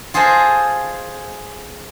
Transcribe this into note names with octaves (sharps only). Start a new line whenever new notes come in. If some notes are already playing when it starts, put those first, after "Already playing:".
F4 G#4 A4 C5 D#5